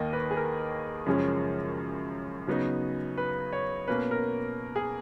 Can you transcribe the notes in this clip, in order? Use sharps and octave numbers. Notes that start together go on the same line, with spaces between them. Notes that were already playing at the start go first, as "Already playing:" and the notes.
Already playing: D#2 D#3 A#3 D#4 D#5
B4
G#4
A#4
F#2 C#3 F3 G#3 C#4
C#3 F#3 B3 D#4
B4
C#5
B2 A#3 C#4 B4
A#4
G#4